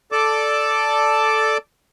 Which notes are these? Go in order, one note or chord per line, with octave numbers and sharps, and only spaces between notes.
A4 D5 A5 D6